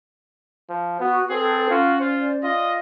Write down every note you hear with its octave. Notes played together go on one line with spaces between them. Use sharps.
F3
B3 F#4
C4 G#4 A4 B4
C#4 F4 F#4
F4 C5 D5
F4 D#5